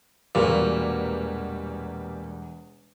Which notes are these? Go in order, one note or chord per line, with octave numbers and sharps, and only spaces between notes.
E1 E2 A#2 G3 A#3 F#4